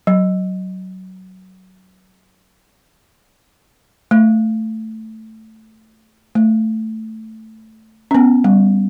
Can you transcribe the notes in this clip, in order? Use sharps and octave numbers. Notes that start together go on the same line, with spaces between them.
F#3
A3
A3
C#4
B3
G3